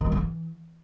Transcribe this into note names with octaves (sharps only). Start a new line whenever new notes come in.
D#3
G3
D3
E3